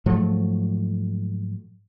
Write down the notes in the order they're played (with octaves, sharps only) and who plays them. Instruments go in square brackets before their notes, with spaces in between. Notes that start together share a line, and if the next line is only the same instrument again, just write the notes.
[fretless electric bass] G#2 F3 F#3 A3